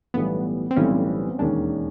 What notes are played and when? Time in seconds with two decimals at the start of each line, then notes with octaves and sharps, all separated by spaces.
0.14 B1 A2 E3 G3 B3
0.71 C4
0.76 B1 A2 E3 G3 C#4
1.39 E1 D#2 D#3 G#3 C#4 D4